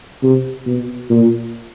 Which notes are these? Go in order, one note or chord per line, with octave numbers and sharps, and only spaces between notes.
C3
B2
A#2